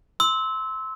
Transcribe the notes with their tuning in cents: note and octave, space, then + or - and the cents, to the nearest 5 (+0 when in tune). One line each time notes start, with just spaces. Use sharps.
C6 +0 E6 -20